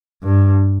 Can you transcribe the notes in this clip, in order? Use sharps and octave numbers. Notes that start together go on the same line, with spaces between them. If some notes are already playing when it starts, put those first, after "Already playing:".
G2